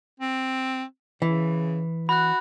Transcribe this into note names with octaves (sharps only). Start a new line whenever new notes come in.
C4
C#3 E3
F#4 B5 F#6